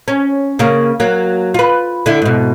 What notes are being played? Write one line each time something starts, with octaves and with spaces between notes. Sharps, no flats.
C#4
C#3 A#3
F#3 A#3
F4 B4
D3 E4
G#2 B2